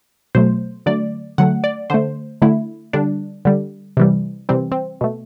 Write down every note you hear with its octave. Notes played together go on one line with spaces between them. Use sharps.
B2 F#3 A3 C5
D3 F#3 A3 D5
D3 F#3 A3 F#5
D5
D3 A3 C5
D3 A3 E4
D3 G3 D4
D3 G3
C3 E3 G3
C3 E3 G3 C4
C4
B2 A3